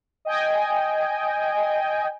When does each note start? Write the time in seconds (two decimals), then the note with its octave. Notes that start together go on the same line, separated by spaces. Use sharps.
0.25 D#5 G5 G#5